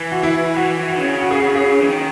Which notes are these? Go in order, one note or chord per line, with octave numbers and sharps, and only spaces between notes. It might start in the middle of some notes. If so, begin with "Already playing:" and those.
Already playing: E3
F#4
E4
E3 F#4
E3
F#4
D#3
C#3
F#4
G#4
F#4
G#4
E3
D#3